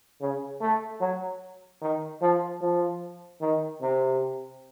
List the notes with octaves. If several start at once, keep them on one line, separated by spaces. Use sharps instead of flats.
C#3
A3
F#3
D#3
F3
F3
D#3
C3